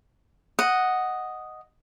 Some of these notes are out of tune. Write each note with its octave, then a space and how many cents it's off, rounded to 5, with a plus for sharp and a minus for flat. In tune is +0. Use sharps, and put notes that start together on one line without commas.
D#5 +0 F#5 +0